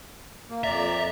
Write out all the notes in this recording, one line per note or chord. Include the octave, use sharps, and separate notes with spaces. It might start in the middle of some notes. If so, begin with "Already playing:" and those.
A#3
F2 D5 E5 A#5